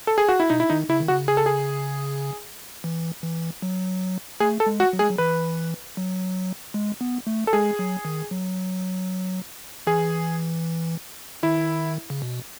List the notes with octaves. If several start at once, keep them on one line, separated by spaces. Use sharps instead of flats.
A4
G#4
F#4
E4
B2 D#4
E4
D#3 D#4
C#3 E4
D#3
C#3 F#4
G#4
A4
G#4
E3
E3
F#3
A3 G#4
A4
G#3
F#4
F#3
G#3 G#4
F#3
E3 B4
F#3
G#3
B3
A3
A4
G#3 G#4
F#3
D#3
F#3
E3 G#4
D#3 E4
C#3
B2